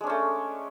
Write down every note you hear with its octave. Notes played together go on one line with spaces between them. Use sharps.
G#3 A3 C#4 D4